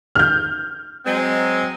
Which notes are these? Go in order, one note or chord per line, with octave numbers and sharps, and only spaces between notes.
F6 G6
F#3 G#3 C4